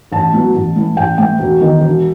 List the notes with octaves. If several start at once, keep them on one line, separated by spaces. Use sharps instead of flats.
A1 A5
A2 F#3 B3
A1
A2 E3
A1 G5
A2 E3 G5
E1
E2 D#3
E1